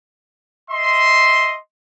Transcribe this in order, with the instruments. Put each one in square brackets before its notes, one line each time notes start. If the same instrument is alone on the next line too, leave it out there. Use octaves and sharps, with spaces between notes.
[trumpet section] D#5 E5 C6